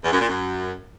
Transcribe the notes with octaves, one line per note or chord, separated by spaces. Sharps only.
E2
F#2
A#2
F#2